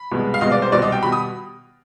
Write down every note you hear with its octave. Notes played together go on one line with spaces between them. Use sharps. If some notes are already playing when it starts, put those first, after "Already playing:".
Already playing: B5
C2 B2 G#3 B3
F5
C2 B2 G#3 B3 D#5
D5
C5
C2 B2 G3 D5
D#5
G5
B2 G3 B5
D#6